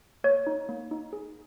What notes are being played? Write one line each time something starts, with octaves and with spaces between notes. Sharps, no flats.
A#3 C#5
D#4
A#3
D#4
G#4